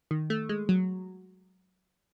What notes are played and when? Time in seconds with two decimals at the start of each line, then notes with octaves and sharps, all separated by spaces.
0.11 D#3
0.30 A3
0.49 G#3
0.69 F#3